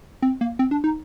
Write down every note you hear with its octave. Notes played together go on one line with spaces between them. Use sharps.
C4
A#3
C4
D4
D#4